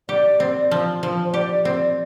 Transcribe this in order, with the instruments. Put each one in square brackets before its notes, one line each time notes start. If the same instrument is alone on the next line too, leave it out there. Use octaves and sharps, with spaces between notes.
[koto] G4 [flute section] D5
[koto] C4
F3
F3
[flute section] C5
[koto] G4 [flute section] D5
[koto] C4